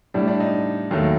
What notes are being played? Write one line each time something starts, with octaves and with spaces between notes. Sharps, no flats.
A2 G3 D4
D4
D#4
D#2 D#3 F#3 A3